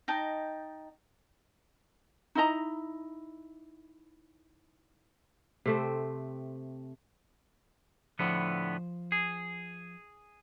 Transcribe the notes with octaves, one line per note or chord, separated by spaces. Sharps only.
D#4 D#5 G5 A5
D#4 E4 D#5 A#5
C3 A3 C4
A2 D3 F3 B3 C5
G#4